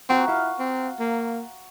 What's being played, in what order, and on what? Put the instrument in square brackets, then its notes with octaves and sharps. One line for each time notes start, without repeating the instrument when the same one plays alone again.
[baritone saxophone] C4 [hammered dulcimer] F#4 A#5
[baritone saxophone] E4 [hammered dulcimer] F5
[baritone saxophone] C4
A#3